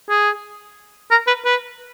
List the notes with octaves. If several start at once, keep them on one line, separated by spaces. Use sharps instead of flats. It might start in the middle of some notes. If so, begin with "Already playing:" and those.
G#4
A#4
B4
B4